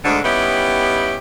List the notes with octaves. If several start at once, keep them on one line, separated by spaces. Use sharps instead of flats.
D2 G#2 D3
G3 B3 C#4 D#4 E4 G4